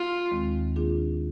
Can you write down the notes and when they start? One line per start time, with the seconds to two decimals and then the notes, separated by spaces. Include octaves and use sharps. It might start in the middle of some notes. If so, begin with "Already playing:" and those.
Already playing: F4
0.31 D#2 D#3 G#3 C4
0.76 D#3 A#3 D4 F4 G#4